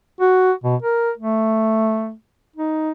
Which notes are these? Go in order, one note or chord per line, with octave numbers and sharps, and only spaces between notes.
F#4
B2
A#4
A3
D#4